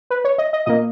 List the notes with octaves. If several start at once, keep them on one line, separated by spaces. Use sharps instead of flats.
B4
C#5
D#5
D#5
A#2 A#3 D#5